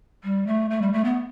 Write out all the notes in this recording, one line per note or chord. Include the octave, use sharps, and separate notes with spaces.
G3
A3
A3
G3
A3
B3